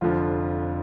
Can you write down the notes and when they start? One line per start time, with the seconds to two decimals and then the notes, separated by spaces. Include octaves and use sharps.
0.01 F1 F2 D3 F3 F4